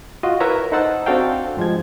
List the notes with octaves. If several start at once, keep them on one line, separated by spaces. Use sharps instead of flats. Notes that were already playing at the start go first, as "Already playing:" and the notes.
F4 F#4 D#5
E4 A#4 B4 C#5 E5 A#5
D#4 A4 C5 F#5 A5 E6
C4 D4 F#4 A4 F5 G5
G2 F3 G#3 G#6